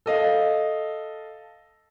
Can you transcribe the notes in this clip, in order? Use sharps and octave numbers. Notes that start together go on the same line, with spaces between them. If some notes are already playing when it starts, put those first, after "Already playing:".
A4 D#5 F5